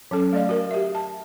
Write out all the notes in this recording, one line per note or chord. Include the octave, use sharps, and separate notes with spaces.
F#3 C#4 A4
A3 D5 D#5 F5
F#4 A#4
G4 E5
A5